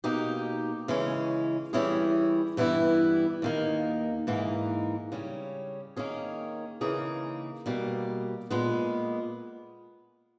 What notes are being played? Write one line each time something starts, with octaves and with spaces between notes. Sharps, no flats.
B2 A#3 D#4 G4
C#3 E3 G#3 C#4
E3 G3 C#4 E4 G#4
G2 E3 G3 B3 E4
D#2 D#3 A#3
G#2 E3 A#3 D#4
C#3 G3 C#4
D#3 A#3 C#4 G#4
C#3 E3 A#3 D#4 G#4
B2 G3 A#3
A#2 G#3 B3